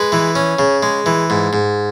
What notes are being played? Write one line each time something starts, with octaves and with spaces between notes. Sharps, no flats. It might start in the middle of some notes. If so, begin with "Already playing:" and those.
Already playing: G#3 B4
E3
C#4
C#3
G#3
E3
G#2
G#2